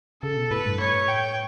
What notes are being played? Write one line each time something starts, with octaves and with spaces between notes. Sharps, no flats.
C#3 A4
B2
A2 B4
G2
A2 C#5
G5